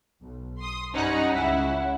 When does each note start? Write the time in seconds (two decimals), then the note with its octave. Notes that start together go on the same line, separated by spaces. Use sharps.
0.22 B1
0.61 C6 D#6
0.94 G2 G3 C#4 D#4 F#5
1.36 C#2 E4